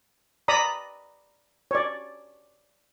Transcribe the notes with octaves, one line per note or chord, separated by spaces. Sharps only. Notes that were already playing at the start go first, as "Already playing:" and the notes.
D5 A#5 B5 D#6
C#5 D5